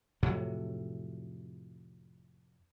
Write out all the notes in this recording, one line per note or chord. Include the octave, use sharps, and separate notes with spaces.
F2 A2 C3 F#3